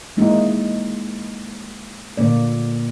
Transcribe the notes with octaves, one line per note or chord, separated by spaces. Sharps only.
G#3 A#3 D#4 E4
A#2 D3 A#3 D5